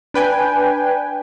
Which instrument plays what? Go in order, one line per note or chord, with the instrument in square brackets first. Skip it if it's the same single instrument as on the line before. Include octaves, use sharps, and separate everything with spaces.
[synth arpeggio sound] D4 B4 G5 G#5